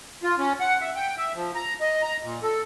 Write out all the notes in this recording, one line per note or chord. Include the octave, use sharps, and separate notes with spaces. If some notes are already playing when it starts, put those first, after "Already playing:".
F4
C#4
F#5
E5
G5
E5
F3
A#5
D#5
A#5
A#2
A4